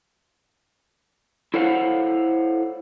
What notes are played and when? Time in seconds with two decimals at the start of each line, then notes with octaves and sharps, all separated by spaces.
1.54 E4 A4 C5 C#5 F5 F#5